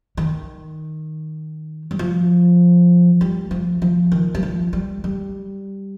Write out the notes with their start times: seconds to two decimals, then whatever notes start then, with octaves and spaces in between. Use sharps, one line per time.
0.17 D#3
1.91 G3
1.99 F3
3.21 G3
3.51 F3
3.82 F3
4.12 D#3
4.35 G3
4.43 F3
4.73 G3
5.04 G3